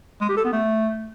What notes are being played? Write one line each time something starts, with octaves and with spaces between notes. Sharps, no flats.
G#3
G4
A4
B3
A3